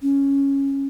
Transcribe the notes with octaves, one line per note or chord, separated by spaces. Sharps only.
C#4